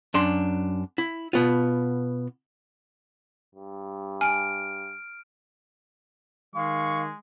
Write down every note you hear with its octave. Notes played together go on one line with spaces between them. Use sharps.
F#2 D4 C6
E4
B2 B3 F4
G2
G#5 F6 D7
D#3 G#3 F5 C#6